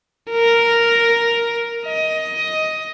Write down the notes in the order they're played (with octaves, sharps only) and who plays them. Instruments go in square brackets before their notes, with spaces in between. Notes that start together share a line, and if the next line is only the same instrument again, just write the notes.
[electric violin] A#4
D#5